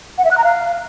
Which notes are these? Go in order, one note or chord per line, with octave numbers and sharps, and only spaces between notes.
F#5
E5
F#6
A#5
F5